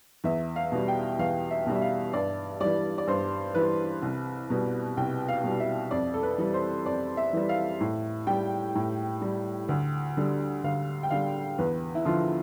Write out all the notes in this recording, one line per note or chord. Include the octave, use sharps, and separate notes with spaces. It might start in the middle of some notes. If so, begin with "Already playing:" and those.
E2 E5
F5
B2 G3
G5
E2 F5
E5
B2 G3
E5
F5
G2 D5
E3 G3 D5
D5
G2 C5
E3 G3 B4
C2
B2 G3
C2 G5
F5
B2 G3
E5
F2 D5
A4
B4
E3 G3
C5
F2 D5
E5
E3 G3
F5
A2
G3 G5
A2
G3
D2
D3 G3
D2 F5
G5
D3 G3 F5
E2 B4
E4
D3 F3 F4